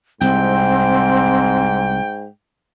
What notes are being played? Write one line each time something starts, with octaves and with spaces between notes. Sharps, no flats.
C2 G#2 C4 G5